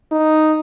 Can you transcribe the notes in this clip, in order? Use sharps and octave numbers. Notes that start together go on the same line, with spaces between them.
D#4